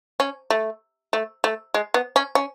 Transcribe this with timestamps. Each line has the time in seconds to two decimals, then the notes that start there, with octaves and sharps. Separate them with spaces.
0.20 C#4
0.50 A3
1.13 A3
1.44 A3
1.74 G#3
1.94 B3
2.16 C#4
2.35 C#4